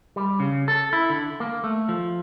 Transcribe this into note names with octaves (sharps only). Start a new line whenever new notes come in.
G3
C#3
A4
E4
D3
A#3
A3
F3